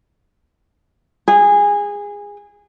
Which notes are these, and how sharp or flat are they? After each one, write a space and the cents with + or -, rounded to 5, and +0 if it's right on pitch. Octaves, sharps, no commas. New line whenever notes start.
G#4 -20